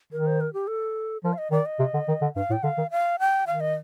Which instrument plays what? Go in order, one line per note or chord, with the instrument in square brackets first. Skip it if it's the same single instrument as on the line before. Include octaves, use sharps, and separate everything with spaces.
[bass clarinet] D#3 [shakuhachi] A#4
[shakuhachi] C5
A#4
G4
A4
[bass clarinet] F3 [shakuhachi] A#4
[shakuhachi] F5
D#5
[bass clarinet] D#3 [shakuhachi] D5
[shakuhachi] D#5
[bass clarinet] C3
D3
D#3
D3
[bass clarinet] G2 [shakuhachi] F5
[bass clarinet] A2 [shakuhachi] G5
[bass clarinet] D3 [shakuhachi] F5
[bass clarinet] D#3
[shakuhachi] F5
G5
[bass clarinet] D#3 [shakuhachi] F5
[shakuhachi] D#5